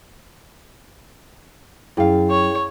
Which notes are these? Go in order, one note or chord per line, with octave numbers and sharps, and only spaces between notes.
F#2 E4 G#4 F5 G5
C#5